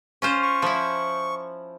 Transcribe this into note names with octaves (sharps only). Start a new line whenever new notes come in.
C#4 F4 C5
C#6
F3 E4